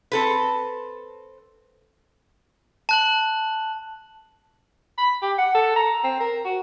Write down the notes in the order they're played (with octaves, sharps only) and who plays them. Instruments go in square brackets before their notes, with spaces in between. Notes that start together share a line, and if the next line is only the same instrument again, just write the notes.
[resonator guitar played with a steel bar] C4 A4 B4
[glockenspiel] A5 F#6 F#7
[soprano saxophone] B5
G4
F#5
A4
A#5
C4
A#4
F#4